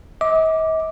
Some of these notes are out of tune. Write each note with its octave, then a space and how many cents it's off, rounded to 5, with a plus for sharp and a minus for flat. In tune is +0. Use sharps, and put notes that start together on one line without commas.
D#5 +45 D6 +0